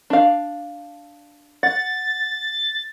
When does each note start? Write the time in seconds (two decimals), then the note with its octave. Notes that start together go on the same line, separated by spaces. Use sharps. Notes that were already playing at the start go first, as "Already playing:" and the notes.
0.10 D4 F5
1.63 F#5 A6